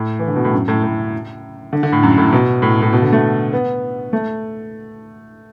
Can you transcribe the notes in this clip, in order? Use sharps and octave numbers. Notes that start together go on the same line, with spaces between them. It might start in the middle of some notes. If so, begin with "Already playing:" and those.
Already playing: A2
E3
D3
B2
A2
F#2
A2
A2
D3
D3
A2
F#2
A2
B2
A2
A2
B2
D3
A3
B3
A3